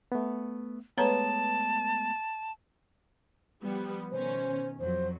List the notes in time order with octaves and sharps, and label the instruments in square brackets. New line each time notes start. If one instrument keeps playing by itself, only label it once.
[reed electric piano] A3 B3
[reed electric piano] G#3 A3 B3 [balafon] B4 C#5 A#5 [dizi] A5
[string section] F3 G3 B3
[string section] B2 D#3 C#4 [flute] C5
[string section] F2 F#3 [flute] C5